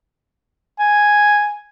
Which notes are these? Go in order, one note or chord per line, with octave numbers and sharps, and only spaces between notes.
G#5